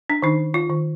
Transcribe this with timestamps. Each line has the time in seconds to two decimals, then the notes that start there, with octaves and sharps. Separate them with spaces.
0.10 D4
0.22 D#3 D#4
0.54 F4
0.70 D#3